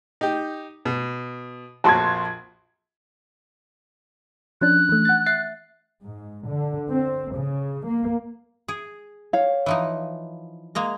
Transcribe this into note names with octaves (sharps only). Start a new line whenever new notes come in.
D#4 G4
B2
A#1 F2 F#4 A5 C6 G#6
F3 C#4 D4 F#6
E3 A3
F#5 A6
E5 A6 C7
G#2
D3
C4
C#3
A#3
G#4
C#5 F5
E3 F3 D#4
G#3 A#3 A#5